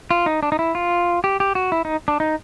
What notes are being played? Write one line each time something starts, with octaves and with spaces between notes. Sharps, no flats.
F4
D#4
D4
D#4
E4
F4
G4
G4
F#4
E4
D#4
D4
D#4